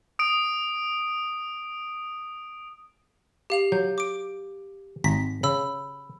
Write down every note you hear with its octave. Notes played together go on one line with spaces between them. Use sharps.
D#6 D7
G4 F5 F7
F#3 G6
D6 D7
G#1 A#5 B6
C#3 B5 E6